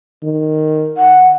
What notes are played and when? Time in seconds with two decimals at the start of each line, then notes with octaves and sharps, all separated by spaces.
0.23 D#3
0.97 F#5